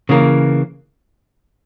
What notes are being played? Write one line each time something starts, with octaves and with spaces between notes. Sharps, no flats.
C#3 E3 A#3